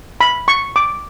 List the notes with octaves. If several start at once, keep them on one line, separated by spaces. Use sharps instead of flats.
B5
C#6
D6